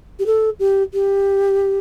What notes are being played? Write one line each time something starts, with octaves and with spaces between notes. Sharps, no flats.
G4
A4
G4
G4